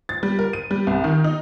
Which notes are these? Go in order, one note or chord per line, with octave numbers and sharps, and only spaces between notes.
A6
G3
A#4
D#7
G3
C2
D#3
D#4